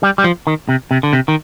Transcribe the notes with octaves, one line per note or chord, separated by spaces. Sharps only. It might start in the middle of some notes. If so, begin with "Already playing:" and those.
G3
G3
F3
D#3
C3
C3
D3
C3
D#3